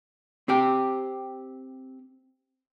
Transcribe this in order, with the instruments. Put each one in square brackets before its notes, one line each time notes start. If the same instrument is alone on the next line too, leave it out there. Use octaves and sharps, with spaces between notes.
[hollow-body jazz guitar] C4 G4 G5